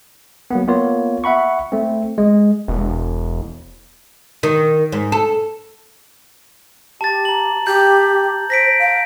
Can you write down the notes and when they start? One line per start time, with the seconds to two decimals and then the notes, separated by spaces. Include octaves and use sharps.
0.51 F#3 A#3 B3
0.68 A#3 B3 F4 C#5
1.24 E5 F#5 B5 C#6
1.72 A3 C4
2.18 G#3
2.68 E1
4.43 D#3
4.92 G#2
5.12 A4
7.01 G4 A5 A6
7.25 A#5 F#7
7.67 G4 G6
8.50 C5 A#6 B6 D7
8.79 F5